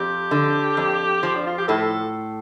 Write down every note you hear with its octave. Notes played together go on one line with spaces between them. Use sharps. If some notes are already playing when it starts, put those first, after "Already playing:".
Already playing: F2 G4
D3
F2
F3
D4
F4
G4
A2 A4